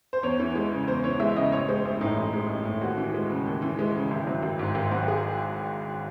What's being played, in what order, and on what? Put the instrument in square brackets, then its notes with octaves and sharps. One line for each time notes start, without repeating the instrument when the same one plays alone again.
[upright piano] C5
E2 C#5
E3
G#3
C#3
E2 C5
E3 C#5
G#3 E5
C#3 D#5
A1 C#5
G#3 C5
A1 E4
A2 D#4
A1
G#3
A1
A2
D#2 F#4
E3
G#3
C#3
D#2
E3
G#3
C#3
G#1 E4
F#3
G#1
G#2
G#1
F#3 F#4
G#4